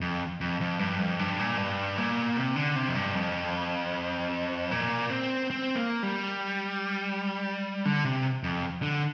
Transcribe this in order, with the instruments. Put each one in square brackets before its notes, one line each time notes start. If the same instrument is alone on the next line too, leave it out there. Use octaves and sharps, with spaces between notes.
[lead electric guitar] F2
F2
F2
G2
F2
G2
A#2
G2
A#2
C3
D3
C3
F2
G2
F2
A#2
C4
C4
A#3
G3
D3
C3
F2
D3